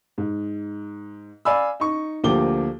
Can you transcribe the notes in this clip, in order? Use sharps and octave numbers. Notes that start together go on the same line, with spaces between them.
G#2
D5 F5 G#5 B5 E6
D#4 C#6
D2 F3 A#3 G4 D6 G7